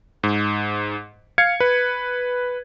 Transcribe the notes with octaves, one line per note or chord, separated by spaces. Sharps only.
G#2
F5 G#6 C#7
B4